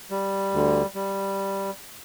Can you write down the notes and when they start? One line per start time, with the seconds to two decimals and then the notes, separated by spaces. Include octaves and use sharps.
0.10 G3
0.53 D2 D3
0.95 G3